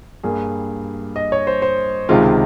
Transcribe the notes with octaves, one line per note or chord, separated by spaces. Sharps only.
G2 G3 A#3 G#4
D#5
C#5
C5
C5
C#2 C3 D#3 G#3 F4